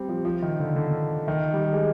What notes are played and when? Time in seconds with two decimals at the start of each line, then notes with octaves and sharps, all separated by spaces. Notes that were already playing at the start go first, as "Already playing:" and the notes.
Already playing: G3 C4
0.09 F3
0.25 F3
0.42 D#3
0.60 D3
0.76 D3
1.28 D#3
1.53 G3
1.73 G#3